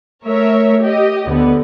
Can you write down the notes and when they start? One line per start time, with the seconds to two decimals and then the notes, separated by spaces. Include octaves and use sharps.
0.23 A3 A#4 C#5 E5
0.81 G4 D#5
1.27 D2 D3 B3